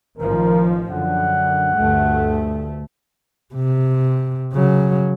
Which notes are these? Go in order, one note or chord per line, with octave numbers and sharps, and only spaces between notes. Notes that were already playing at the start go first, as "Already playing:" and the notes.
A1 D#3 F3 A#4
F#2 D3 F#5
D2 G2 A3
C3
C#3 F#3